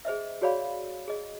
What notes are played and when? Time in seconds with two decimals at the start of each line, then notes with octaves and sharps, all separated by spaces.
0.05 G#4 C5 D#5 E5
0.42 F#4 G#4 C#5 D5 F5 B5
1.08 G#4 D#5